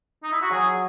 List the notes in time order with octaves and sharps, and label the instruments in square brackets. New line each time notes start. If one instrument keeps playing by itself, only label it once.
[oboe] D#4
E4
F#4
[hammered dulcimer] F#3 [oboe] G#4